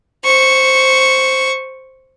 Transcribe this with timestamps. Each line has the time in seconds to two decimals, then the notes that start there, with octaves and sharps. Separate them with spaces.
0.25 C5 C#6